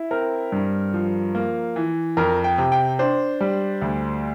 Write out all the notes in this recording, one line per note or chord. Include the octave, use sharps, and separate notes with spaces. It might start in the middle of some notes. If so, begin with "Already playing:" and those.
Already playing: E4
C4 A#4
G2
F3
A#3
E3
F2 A#4
G5
C3
G5
D4 C5
G3
D2